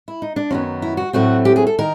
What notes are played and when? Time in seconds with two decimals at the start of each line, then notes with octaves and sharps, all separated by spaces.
0.08 E4
0.22 D#4
0.36 D4
0.51 F#2 D#3 F#3 B3 C#4
0.82 E4
0.97 F#4
1.13 A2 F#3 A3 C4 F#4
1.45 G4
1.56 G#4
1.67 A4
1.79 D#3 A#4